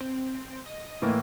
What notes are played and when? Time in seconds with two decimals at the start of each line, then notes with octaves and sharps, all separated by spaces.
0.01 C4
0.66 D#5
1.02 A2 E3 A#3